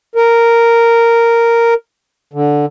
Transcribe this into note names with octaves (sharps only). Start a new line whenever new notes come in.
A#4
D3